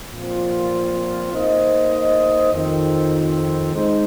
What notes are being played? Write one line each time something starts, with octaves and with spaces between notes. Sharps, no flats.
A#2 F3 C4 F4
A#3 D#4 C5 D#5
F2 D#3 C4
G#3 D#4 C5